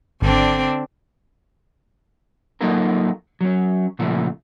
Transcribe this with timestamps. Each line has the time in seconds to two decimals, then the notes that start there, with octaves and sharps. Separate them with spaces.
0.22 G#1 D3 C4 D4
2.61 F#3 A#3 D#4 F4 A4 A#4
3.41 F#3 C#4
3.99 A#2 C#3 F3 A3 F4